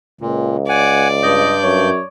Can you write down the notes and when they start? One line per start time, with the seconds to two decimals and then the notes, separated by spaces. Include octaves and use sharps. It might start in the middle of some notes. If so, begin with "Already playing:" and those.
0.21 C#2 A#2
0.69 D5 F#5 G#5
1.23 G2 D#5 G6
1.63 F#2 C#5